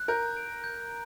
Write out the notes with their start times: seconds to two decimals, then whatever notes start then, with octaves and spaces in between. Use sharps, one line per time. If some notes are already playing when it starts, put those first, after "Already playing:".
Already playing: F#6
0.08 A#4 G6
0.37 D7
0.64 G6